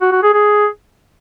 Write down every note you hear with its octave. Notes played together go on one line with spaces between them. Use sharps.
F#4
F#4
G#4
G#4